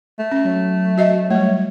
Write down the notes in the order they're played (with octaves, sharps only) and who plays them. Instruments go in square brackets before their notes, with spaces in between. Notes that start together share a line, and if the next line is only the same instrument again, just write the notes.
[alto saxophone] A3
[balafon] C#4
[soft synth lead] F#3
[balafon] F#4 D#5 E5
[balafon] G3 A3 [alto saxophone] C#5